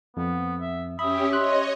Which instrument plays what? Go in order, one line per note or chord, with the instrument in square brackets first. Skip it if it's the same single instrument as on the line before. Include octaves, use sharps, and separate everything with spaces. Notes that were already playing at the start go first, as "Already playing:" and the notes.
[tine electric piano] F2 [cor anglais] B3
[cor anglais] E5
[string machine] C#4 G4 [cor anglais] E5 [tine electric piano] B5 [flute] D#6
[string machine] C#5 D#5 [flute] C6 [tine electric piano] F#6